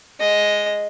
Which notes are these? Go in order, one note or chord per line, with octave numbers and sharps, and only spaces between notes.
G#3 D#5